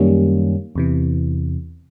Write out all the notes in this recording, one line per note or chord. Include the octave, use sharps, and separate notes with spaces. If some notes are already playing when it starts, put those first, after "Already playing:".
Already playing: F#2 D#3 G3 A#3 C#4
E2 C3 E3